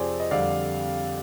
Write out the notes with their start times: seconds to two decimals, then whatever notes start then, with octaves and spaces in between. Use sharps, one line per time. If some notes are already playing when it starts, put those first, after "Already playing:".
Already playing: F2 C3 F3 C4 G#4 C5 D5
0.20 D#5
0.31 F2 D3 G3 D5 F5